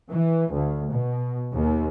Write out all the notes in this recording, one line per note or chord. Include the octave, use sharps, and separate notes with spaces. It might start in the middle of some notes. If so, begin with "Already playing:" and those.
E3
D2
B2
D#2